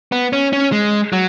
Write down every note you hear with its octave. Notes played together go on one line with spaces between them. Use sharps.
B3
C#4
C#4
G#3
F#3